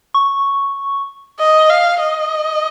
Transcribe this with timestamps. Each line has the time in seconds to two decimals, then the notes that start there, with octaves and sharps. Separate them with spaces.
0.14 C#6
1.39 D#5
1.70 F5
2.00 D#5